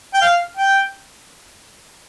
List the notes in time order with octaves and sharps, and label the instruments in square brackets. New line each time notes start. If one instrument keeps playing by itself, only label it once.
[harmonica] G5
F5
G5